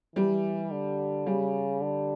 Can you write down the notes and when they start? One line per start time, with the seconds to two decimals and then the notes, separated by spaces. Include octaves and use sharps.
0.16 E3 G3
0.71 D3
1.26 C#3 G3
1.81 D3